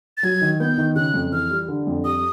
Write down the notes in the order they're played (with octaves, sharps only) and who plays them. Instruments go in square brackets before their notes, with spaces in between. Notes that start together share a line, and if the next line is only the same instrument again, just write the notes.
[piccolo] A6
[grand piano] F#3 [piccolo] G#6
[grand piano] D#3
[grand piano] B3 [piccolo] G6
[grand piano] D#3
[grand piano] C#3 [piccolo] F#6
[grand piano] F2
[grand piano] E3 [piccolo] F6
[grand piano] G3
D3
F2
[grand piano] G3 [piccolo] D#6